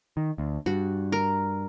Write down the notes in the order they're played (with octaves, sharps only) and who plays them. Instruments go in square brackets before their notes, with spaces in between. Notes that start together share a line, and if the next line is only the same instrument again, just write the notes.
[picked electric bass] D#3
D2
[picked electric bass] G2 [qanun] F#4
[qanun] A#4